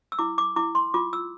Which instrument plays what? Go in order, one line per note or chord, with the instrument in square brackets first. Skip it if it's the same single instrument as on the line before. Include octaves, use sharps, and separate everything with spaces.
[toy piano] E6
E4 D6
D6
E4 D6
C6
F4 D6
E6